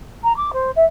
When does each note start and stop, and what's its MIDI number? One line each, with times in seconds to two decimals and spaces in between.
0.24 0.35 82
0.37 0.51 86
0.53 0.71 72
0.76 0.85 76